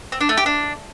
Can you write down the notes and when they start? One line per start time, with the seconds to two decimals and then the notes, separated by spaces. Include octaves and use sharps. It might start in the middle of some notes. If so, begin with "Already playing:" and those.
0.12 C4
0.21 D4
0.29 A3
0.37 G4
0.46 D4